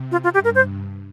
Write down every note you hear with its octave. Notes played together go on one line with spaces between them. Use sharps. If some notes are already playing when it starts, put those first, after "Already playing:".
Already playing: C3
F4
F4
G2 G4
A#4
C5